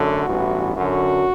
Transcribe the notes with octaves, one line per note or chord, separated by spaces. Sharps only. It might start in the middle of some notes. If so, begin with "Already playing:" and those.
Already playing: F#2 D3 F#3 A3 F#4
A1 G2 E3 B3
F#2 D3 F#3 F#4